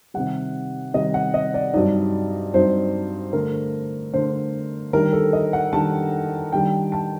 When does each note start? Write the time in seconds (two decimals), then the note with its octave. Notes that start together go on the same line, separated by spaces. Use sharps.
0.14 C3 D#3 G3 F#5
0.94 C3 D#3 G3 D#5
1.14 F#5
1.34 D#5
1.54 D5
1.74 G2 F#3 C4 D#4 D5
2.54 G2 F#3 C4 D#4 C5
3.33 D3 A3 D4 A#4
4.13 D3 A3 D4 C5
4.93 D#3 G3 D4 A#4
5.13 A4
5.33 D#5
5.53 F#5
5.73 D#3 G3 D4 A5
6.53 D#3 G3 D4 G5
6.92 A5